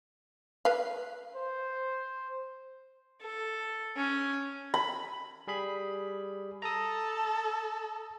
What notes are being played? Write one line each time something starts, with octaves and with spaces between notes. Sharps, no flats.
B4 F5
C5
A4
C#4
B5
G3 G#4 B5
A4 A#5 D#6